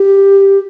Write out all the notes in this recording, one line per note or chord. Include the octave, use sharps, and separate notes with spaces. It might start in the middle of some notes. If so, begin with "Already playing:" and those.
Already playing: G4